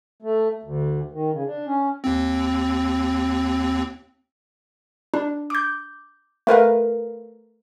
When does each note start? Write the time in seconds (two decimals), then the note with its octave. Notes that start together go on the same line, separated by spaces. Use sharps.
0.22 A3
0.63 D2
1.12 D#3
1.32 C#3
1.46 D4
1.67 C#4
2.04 D#2 C4
5.14 D4
5.50 D6 G6
6.47 A3 A#4 B4 F5